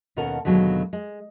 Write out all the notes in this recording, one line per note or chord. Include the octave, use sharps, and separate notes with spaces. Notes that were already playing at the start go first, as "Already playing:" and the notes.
D#2 B2 C#4 A4 A#4 F#5
D#2 B2 D3 F#3 G#3
G#3